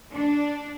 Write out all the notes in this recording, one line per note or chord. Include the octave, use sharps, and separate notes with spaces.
D4